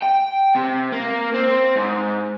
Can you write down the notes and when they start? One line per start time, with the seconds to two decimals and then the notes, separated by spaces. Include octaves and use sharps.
0.03 G5
0.55 C3
0.92 A#3
1.34 C4
1.76 G#2